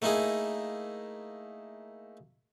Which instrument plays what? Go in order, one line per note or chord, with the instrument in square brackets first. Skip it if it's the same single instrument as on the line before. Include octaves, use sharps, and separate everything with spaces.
[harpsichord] A3 A#3 D#4 E4 G#4